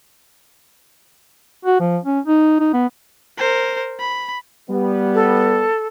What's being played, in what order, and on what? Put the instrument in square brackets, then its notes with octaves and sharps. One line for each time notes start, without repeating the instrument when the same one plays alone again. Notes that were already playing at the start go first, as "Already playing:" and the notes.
[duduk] F#4
F3
C#4
D#4
D#4
B3
[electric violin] A#4 C5
B5
[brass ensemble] G3 B3
[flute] A4